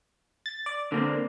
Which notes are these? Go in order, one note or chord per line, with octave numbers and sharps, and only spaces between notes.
A6
D5
D3 A#3 C4